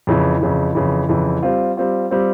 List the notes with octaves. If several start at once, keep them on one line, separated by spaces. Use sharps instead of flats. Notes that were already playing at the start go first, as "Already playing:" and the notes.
F2 C#3 E3
F2 C#3 E3
F2 C#3 E3
F2 C#3 E3
G3 C4 F4
G3 C4 F4
G3 C4 F4